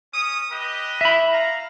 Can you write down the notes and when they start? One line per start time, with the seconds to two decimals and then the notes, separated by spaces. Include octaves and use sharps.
0.13 C#4 D#6
0.52 G4 B4 D#5
1.01 E5 B5
1.32 F5 A#5